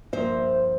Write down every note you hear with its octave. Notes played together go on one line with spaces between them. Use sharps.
G2 F3 A#3 C5 E5